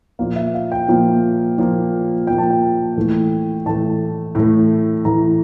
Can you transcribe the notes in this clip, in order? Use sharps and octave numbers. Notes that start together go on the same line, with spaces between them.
A#2 F3 A#3 F5
E5
F5
G5
A#2 F3 A#3
A#2 F3 A#3
A#2 F3 A#3 G5
A5
G5
A2 E3 A3
A2 E3 A3 A5
A2 E3 A3
A2 E3 A3 A#5